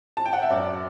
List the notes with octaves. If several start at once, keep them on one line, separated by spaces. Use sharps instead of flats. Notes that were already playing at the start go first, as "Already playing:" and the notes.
A5
G5
F#5
E5
F#2 D5